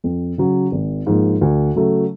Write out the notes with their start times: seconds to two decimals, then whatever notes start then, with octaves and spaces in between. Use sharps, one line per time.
0.04 F2
0.38 C#3 F#3
0.72 G#1
1.07 G#2 F3 A#3
1.41 D2
1.75 C#3 F#3 A3